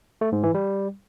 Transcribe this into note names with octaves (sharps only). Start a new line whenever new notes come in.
A3
G#2
E3
G3